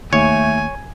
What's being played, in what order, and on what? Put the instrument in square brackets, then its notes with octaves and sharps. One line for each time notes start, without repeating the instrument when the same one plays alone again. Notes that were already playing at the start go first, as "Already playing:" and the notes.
[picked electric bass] D#2 [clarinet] A3 [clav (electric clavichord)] C#5 [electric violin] G#5